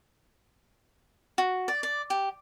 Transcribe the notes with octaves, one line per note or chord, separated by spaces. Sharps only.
F#4
D5
D5
G4